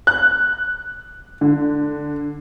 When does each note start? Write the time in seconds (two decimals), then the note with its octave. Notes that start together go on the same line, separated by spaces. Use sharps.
0.07 F#6
1.41 D3